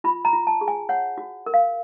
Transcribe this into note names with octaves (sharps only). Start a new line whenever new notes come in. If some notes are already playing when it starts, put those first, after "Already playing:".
F4 B5
A#5
F4
A5
G#4
G#5
C#5 F#5
F#4
A#4
F5